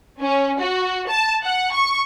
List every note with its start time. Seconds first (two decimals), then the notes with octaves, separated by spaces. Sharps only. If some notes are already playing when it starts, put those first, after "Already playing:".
0.21 C#4
0.59 F#4
1.08 A5
1.42 F#5
1.72 C#6